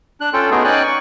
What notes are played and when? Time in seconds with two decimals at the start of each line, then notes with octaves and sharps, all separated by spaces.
0.21 D4 F#6
0.34 C#4 F4 A4 G5
0.51 A3 B3 D#4 F#4 G#4
0.64 C#4 D#4 D5 G5 G#5 F#6
0.83 C#6